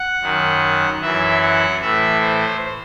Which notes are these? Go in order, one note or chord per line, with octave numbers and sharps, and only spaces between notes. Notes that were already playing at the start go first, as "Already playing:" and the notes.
Already playing: F#5
F#2 D#3
F#2 E3 E5
F#5
A2 E3 E5
C5